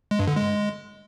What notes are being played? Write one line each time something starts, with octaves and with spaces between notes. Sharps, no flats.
G#3
G2
D3
G#3